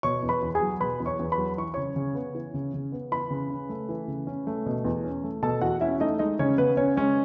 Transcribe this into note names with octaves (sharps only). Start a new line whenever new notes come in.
B2 C#5 C#6
E2
B4 B5
E2
G#4 G#5
F#3
B2 B4 B5
E2
C#5 C#6
E2
B4 B5
F#3
E3 C#6
C#3 C#5 C#6
C#3
B3
E3
C#3
C#3
B3
E3 B4 B5
C#3
C#4
A3
E3
C#3
C#4
A3
B2
E2
C#4
A3
B2 A4 A5
E2 F#4 F#5
C#4 E4 E5
A3 D#4 D#5
G#3 D#4 D#5
C#3 C#4 C#5
C#3 B3 B4
C#4 C#5
G#3 C#4 C#5